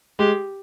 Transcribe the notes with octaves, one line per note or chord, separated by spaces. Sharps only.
G#3 G4